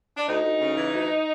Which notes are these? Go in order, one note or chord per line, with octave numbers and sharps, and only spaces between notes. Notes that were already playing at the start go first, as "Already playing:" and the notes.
D4
D2 D#4
D2
C#3
E3
D2